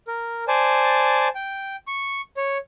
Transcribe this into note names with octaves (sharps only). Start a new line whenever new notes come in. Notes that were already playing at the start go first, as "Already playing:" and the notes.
A#4
C5 D5 G#5 A5
G5
C#6
C#5